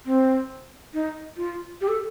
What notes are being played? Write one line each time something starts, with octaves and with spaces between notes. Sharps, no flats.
C4
D#4
F4
G4
A4